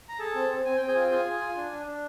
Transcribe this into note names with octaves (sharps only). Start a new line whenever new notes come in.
A#5
G#4 A4 A5
C4
C4
C4 G#5
C4 G5
G#4 G#5
F4 G5
F4 G#4 G#5
G#4
F4
D4
D4
D4